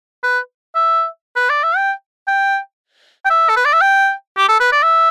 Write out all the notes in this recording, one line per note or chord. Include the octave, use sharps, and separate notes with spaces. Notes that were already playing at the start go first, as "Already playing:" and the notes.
B4
E5
B4
D5
E5
G5
G5
G5
E5
A4
B4
D5
E5
G5
G4
A4
B4
D5
E5